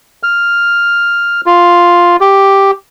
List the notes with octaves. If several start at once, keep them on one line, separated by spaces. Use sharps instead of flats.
F6
F4
G4